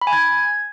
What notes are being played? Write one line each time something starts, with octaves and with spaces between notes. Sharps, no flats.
B5
G#5
G#6